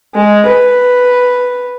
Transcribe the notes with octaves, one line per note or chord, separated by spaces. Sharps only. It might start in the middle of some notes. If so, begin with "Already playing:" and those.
G#3
B4